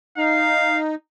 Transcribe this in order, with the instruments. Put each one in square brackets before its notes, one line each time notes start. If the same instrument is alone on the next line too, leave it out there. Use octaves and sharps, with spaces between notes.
[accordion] D#4 [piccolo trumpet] F5